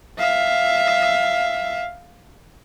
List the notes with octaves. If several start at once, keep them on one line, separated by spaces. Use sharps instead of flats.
E5 F5